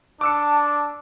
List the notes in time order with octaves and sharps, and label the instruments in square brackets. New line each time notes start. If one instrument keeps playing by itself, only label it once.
[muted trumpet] D4 [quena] A5 [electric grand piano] D6 E6 C#7